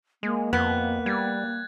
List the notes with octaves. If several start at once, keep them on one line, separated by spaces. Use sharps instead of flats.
G#3 A#3
F2 B3 F#6
G3 G#6 A6